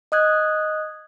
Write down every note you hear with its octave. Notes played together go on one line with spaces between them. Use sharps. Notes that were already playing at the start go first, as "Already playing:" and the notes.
D#5 D#6 F#6 G#6